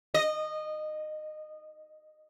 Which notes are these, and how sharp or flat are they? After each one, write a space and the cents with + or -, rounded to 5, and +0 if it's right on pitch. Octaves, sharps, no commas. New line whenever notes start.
D#5 -20